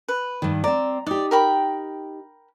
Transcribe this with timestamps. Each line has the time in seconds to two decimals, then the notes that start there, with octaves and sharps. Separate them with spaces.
0.08 B4
0.42 G2 D#3
0.64 C4 D5 A#5
1.06 D#4 G4 D5
1.31 A#4 G5 B5